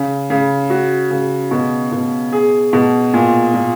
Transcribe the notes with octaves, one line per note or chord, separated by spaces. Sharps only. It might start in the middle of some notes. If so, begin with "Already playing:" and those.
Already playing: C#3
C#3
F#4
C#3
B2
B2
G#4
B2
A#2
A#2